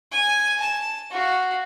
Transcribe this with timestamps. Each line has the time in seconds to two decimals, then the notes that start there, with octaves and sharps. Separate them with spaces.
0.12 G#5
0.60 A5
1.11 F#4 F5